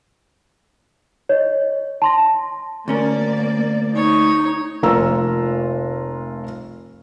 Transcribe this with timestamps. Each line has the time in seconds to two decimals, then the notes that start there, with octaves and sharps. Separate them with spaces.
1.29 C#5 D#5
2.02 A5 C6 A#6
2.88 D2 A#3 C#4 A#4 D5
3.95 D#4 C#5
4.83 F1 A#3 F4 A#5 E6